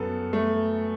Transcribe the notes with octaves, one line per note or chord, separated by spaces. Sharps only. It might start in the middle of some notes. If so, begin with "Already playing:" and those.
Already playing: F#2 B3 A4
A3